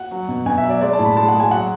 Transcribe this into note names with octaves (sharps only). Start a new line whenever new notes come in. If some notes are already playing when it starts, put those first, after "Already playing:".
Already playing: F#5
F#3
B2
B2 G#5
E5
F#3
D5
G#3 D5
A5
A2
B5
G#3 A5
F#5
G#3
G#5
F#3 F#5